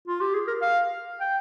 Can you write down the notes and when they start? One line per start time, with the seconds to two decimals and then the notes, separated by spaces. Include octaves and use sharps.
0.08 F4
0.21 G4
0.34 G#4
0.48 A#4
0.62 F5
1.21 G5